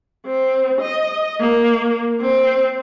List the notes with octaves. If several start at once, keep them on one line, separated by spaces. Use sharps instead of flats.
C4
D#5
A#3
C4